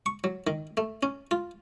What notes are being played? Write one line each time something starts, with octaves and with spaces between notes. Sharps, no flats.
C#6
F#3
D#3
A3
C#4
F4